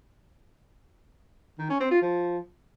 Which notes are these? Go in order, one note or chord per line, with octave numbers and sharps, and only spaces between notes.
D#3
C#4
C4
F4
F3